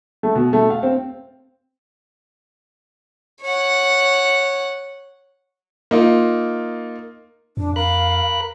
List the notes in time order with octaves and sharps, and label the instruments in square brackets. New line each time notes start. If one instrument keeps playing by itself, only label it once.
[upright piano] A3
B2
A3
F5
C4
[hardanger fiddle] C#5 F#5
[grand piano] A#3 D#4 F4
[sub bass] F2 [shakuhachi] D4
[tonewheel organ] A#4 B5 F#6 [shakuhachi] F5